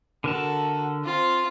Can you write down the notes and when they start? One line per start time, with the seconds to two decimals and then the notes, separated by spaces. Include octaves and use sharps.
0.24 D3 F#4 A4 A#4 A5
1.04 C4 F4